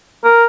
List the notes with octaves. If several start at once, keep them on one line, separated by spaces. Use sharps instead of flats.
A#4